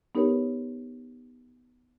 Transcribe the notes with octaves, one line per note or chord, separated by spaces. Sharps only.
B3 D#4 G4 A#4 B4 C#5